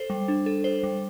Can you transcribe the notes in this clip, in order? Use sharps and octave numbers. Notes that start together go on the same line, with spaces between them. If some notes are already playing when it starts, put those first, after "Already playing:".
Already playing: A4 C5
G3
D4
A4
C5
G3